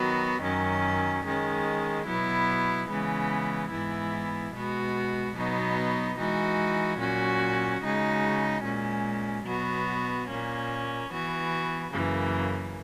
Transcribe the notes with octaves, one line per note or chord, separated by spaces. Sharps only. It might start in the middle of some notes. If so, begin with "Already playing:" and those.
Already playing: D#3 F#3 B3 F#4
F#2 D#3 F#3 C#4
D#3 G#3 C#4
B2 F#3 B3 E4
C#3 E3 G#3 B3
G#2 E3 B3 E4
B2 G#3 B3 F#4
B2 F#3 B3 D#4 F#4
E3 G#3 D#4 F#4
A#2 F#3 C#4 F#4
C#3 G#3 D#4 F#4
A#2 G#3 C#4
B2 F#3 B3 F#4
A#2 A#3 C#4
E3 B3 F#4
F#2 C#3 E3 A#3